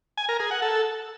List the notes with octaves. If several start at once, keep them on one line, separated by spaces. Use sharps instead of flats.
G#5
A#4
G#4
F#5
A4